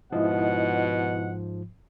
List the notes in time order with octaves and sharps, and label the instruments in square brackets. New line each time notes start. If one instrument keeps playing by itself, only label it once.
[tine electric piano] G#2 F3 [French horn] B2 [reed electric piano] E4 D#5 [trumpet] F#5